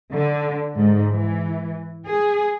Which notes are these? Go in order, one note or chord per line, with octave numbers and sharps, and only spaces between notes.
D3
G#2
E3
G#4